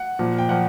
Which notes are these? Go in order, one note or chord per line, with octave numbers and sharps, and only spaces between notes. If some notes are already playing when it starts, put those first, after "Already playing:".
Already playing: F#5
A#2 F3
G5
A#2 F3 F#5